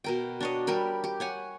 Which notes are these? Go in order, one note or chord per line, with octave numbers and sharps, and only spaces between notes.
B2 A#4 G5
D4 C#5 D#5
G3 G4 A#4 B5
G4
C#5 F#5 G#5